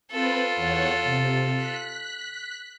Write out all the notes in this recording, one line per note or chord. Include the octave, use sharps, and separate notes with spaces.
C4 F4 A4 B4 B5
E2 C#5 F#5
C3
F#6 B6